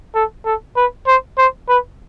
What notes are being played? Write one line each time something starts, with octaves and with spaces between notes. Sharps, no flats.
A4
A4
B4
C5
C5
B4